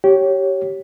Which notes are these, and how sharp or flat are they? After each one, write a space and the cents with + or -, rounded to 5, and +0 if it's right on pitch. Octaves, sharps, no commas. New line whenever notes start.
G4 -20 C#5 +0